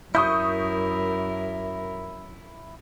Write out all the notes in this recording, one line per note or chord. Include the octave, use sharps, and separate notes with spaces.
F#2 E4 A#4 C#6 D#6 G6